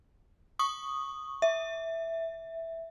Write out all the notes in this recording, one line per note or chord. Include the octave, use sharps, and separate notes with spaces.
C#6 D#6
E5